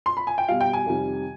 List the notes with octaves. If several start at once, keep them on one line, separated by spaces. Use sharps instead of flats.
C6
B5
G#5
G5
B2 G3 F5
G5
G#5
F2 C3 D#3 G3